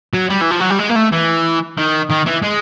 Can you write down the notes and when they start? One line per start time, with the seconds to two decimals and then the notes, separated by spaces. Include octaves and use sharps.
0.13 F#3
0.30 G3
0.41 E3
0.51 F3
0.60 F#3
0.70 G3
0.79 G#3
0.89 A#3
0.95 A3
1.12 E3
1.78 D#3
2.10 D#3
2.27 E3
2.43 G#3